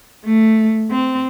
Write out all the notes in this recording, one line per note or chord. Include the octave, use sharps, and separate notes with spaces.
A3
C4